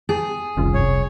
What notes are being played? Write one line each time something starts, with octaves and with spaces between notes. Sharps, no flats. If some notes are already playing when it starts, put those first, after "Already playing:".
G4 G#4 G5 A5
F1 C2 D#3 C#4 F4
G2 C#5